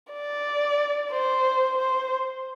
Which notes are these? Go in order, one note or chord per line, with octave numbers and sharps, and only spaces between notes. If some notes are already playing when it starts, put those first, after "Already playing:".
D5
C5
C5